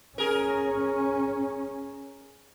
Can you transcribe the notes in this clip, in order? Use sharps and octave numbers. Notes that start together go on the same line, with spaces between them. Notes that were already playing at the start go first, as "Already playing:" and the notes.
C#4 G#4 A#4